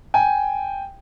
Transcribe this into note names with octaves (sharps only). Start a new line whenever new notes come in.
G5 G#5